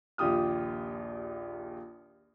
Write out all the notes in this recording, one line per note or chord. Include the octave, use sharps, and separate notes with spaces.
A#1 D#2 F4 G4 D#6 F6